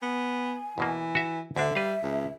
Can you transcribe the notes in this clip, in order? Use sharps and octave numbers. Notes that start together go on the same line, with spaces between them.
B3 G#5
E2 B2 E3 A#3
F#4 E5
D2 D3 D4 E5
G3 B4 F5
C#2